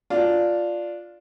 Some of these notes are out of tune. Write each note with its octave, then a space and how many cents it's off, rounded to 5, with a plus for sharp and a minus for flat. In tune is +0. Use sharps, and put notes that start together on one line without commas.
D4 +0 F4 +0